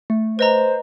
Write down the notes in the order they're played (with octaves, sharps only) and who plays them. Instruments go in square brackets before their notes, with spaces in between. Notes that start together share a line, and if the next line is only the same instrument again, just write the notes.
[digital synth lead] A3
[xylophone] B4 D#5 A#5 [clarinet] C5